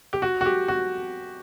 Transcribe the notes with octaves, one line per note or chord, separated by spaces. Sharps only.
G4
F#4
F#4
G4
F#4